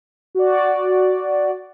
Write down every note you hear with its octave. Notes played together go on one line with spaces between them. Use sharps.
F#4 D5